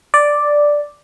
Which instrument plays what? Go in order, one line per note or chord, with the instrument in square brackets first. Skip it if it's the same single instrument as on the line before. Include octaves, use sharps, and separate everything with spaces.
[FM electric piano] D5